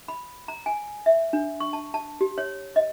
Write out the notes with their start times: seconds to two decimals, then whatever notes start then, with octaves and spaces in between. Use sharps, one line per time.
0.08 B5
0.48 A#5
0.66 G#5
1.06 E5
1.33 D4
1.60 C#6
1.73 A5
1.94 A5
2.21 G4
2.38 C#5
2.76 D#5